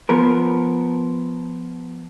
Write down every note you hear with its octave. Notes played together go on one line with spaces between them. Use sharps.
F3 B3 A#4